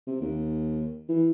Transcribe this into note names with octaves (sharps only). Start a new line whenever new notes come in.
C3
D#2
E3